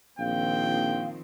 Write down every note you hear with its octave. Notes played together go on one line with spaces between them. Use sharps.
A#1 D#3 F3 C4 F5 G5